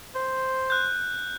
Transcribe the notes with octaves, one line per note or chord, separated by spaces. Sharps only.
C5
F#6 G6